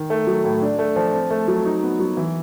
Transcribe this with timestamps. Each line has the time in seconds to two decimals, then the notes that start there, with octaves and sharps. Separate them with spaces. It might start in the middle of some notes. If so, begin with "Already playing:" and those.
Already playing: D#3
0.10 A3
0.27 F#3
0.44 A2
0.62 D4
0.79 A3
0.96 F3
1.13 C4
1.30 A3
1.48 F#3
1.65 D#4
1.83 B3
2.00 F#3
2.17 E3